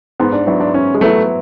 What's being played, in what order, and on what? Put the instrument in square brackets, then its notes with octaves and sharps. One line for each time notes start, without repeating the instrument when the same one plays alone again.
[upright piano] G#2 [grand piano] B3
[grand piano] D4
[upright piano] F#3 B3 E4 [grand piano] D4
[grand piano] D4
[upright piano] G#2 [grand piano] C#4
[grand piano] G#3
[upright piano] F#3 B3 E4 [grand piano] A3